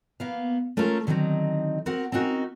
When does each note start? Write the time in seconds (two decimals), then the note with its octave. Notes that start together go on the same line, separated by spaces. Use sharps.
0.20 A#3 B3 F5
0.77 A3 C#4 F4 A4 A#4
1.07 D3 D#3 F#3 C4 D#4
1.86 C4 F#4 A#4 F#5
2.12 C4 C#4 D#4 F#4 A#4